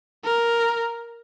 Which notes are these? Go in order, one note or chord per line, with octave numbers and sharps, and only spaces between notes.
A#4